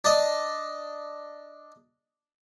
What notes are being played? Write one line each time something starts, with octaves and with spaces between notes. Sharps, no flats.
D4 D#5